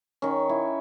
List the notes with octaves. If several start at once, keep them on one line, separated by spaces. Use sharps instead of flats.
D#3 C#4
E4